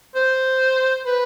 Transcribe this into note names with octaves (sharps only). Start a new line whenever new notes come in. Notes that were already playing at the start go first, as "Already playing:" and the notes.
C5
B4